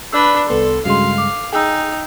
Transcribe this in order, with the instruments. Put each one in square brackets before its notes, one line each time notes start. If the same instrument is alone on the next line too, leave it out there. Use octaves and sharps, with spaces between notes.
[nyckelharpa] D4 B4 [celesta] D5 E6
[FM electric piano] C2 B3 C6 [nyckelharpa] A4
[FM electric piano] G2 C#3 G#3 [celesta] F#4 C6 [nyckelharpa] F5
[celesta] D6
[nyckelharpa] D#4 [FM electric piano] G#4 [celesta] G5 E6